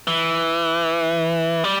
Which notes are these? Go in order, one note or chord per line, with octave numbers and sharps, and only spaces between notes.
E3
G3